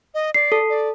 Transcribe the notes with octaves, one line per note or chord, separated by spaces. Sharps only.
D#5
D5 C7
A4
D5